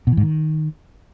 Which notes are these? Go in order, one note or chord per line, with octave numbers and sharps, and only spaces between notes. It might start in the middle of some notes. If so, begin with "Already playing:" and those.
B2
E3
G#2
D#3